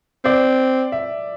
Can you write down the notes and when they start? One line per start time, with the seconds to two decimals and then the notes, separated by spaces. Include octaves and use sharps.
0.25 C4 D5
0.92 E5